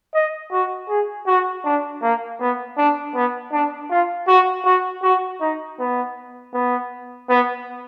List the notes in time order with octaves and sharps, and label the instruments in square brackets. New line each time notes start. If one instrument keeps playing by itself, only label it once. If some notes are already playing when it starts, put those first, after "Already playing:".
[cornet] D#5
F#4
G#4
F#4
D4
A#3
B3
D4
B3
D4
F4
F#4
F#4
F#4
D#4
B3
B3
B3